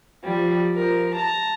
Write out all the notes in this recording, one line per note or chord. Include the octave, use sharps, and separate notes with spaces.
F3 G3
F3 A#4
A5 A#5